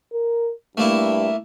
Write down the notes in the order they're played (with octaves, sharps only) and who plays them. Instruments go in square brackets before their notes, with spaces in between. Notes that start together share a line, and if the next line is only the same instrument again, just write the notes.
[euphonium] A#4
[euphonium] G2 [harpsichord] A3 A#3 E4